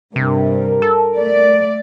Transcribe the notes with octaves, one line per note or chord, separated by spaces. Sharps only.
G2 C3 A#4
A4
A3 D5